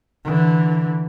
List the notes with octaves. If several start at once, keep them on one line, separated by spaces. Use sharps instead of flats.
D3 E3